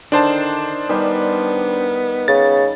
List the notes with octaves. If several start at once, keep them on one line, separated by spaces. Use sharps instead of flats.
D3 D#3 D4 C5 A5
D#3 G3 B3
C#3 A6